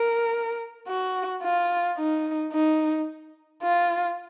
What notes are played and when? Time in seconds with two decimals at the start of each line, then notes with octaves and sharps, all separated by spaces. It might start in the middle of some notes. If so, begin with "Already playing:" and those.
Already playing: A#4
0.88 F#4
1.43 F4
1.97 D#4
2.53 D#4
3.63 F4